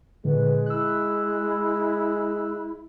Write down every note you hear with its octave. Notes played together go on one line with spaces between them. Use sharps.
A#2 D3 G#3 B4
E4 E6 F#6